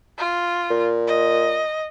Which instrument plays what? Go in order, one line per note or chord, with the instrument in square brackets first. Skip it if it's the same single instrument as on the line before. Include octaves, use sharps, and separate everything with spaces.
[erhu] F4
[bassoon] A#2
[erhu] D#5